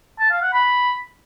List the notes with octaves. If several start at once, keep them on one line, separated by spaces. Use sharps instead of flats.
A5
F5
F#5
B5